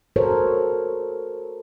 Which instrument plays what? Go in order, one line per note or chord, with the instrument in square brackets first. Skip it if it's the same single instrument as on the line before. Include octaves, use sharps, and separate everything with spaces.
[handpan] F#4 A4 A#4 C5 C#5